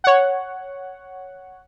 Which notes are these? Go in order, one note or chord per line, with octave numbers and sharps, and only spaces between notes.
C#5 F#5